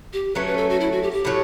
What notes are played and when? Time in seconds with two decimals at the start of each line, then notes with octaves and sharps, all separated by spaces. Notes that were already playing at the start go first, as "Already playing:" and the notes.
0.13 G4
0.35 F#3 A3 C#4 B4
0.47 B4
0.57 A4
0.69 F#4
0.80 E4
0.92 F#4
1.02 G4
1.13 G4
1.25 A2 F#3 C#4